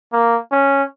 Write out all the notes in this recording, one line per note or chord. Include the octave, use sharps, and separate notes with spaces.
A#3
C#4